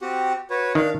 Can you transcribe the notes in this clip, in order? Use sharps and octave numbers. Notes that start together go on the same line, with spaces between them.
C4 F#4 G4
F#4 B4 C#5
D#3 D4 F5